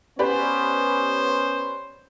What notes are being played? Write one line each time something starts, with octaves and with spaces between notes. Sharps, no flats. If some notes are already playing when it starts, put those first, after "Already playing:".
B3 C#4 G4 B4 C5 D5